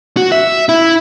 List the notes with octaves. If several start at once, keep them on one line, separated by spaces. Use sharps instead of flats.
F#4
E5
E4